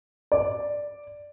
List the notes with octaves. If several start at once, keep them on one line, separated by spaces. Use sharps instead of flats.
D5